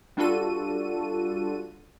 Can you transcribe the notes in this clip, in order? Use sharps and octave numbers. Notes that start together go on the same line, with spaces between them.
G3 D4 F4 F#4 A4 D#7